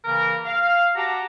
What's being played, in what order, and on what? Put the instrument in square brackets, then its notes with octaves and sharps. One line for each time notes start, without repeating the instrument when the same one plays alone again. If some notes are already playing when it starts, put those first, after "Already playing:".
[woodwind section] C#3 E3 A#3 A#4
F5
F#4 G4 F#5 A5 A#5